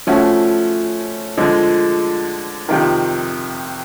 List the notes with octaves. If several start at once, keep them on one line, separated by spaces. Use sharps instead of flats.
F3 A3 C#4 F#4
D3 F3 G#3
F2 C3 D#3